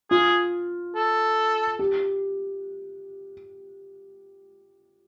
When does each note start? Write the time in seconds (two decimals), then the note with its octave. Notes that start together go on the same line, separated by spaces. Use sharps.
0.10 F4 G#4
0.96 A4
1.79 G4